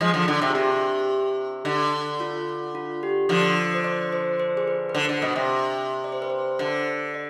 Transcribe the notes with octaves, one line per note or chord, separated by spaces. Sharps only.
F3 G#3
D3 F3
D3 F4
C3
G#4
C3 G4
D3
F4
F4
G4
D3 F3 D5
C5
D5
C5
C5
G#4
B4
B4
D3 C5
D3
B2
C3
D5
C5
B4
C5
D3
D5